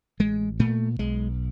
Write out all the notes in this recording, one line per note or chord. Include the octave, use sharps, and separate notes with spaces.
A1 G#3
A#2 A3
B1 G#3